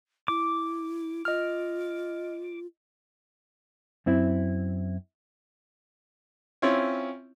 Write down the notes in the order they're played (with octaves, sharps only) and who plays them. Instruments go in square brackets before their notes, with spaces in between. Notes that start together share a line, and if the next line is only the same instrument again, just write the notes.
[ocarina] E4 [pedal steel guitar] D6
[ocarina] F4 [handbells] D#5 F6
[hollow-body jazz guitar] F#2 C4 E4
[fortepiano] C4 C#4 E4 F4 C#5